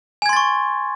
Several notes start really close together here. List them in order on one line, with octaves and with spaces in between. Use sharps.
G#5 G#6 C6 A6 C#6